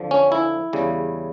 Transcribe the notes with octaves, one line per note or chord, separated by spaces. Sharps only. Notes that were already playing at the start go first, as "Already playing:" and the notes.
Already playing: F2 D3 F3
C#4
E4
E2 C#3 G3